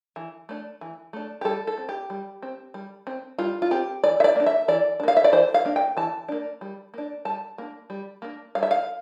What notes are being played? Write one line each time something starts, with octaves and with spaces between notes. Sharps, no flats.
E3
A3 D4
E3
A3 D4
G4
G3 A4
A4
C4
G4
G3
C4
G3
C4
G3 F4
F4
C4 G4
E3 D5
E5
D5
A#3 D4
E5
E3 D5
D4
A#3 F5
E5
D5
E3 C5
F5
A#3 D4
G5
E3 A5
A#3 D4
G3
A#3 D4
G3 A5
A#3 D4
G3
A#3 D4
G3 F5
E5
F5